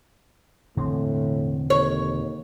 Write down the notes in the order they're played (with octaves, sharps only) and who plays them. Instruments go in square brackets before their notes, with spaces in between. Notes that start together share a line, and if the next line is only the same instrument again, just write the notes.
[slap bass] E1 D3 C4 [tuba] A2
[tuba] D#2 [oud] C#5